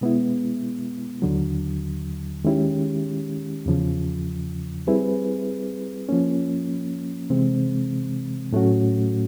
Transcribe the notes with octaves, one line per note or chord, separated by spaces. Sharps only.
B2 G#3 B3 E4
D#2 D3 F#3
D#3 G#3 C#4 E4 G4
E2 C#3 F3
G3 C4 E4 G#4 B4
F3 A#3 C#4
C3 E3 G#3 C4
A2 F#3 A3 C#4 F#4